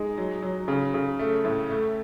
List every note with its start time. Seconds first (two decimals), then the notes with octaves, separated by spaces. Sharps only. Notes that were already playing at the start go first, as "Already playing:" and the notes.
Already playing: G#3 D#4
0.18 F#3
0.42 F#3
0.68 C#3
0.94 C#3
1.19 A3
1.45 A2
1.70 A3